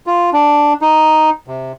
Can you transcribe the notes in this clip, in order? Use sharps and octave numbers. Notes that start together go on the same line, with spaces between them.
F4
D4
D#4
C3